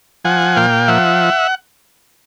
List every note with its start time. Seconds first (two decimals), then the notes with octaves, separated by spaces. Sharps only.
0.25 F3 F#5 G#5
0.56 A#2 F5 G5
0.88 F3 E5 F#5